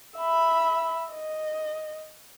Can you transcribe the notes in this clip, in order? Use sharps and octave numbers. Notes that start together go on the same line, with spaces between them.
E5 B5
D#5